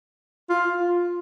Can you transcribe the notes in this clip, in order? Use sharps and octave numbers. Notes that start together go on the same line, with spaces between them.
F4